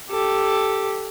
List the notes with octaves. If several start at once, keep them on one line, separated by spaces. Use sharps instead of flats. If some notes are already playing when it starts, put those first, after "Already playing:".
G4 A4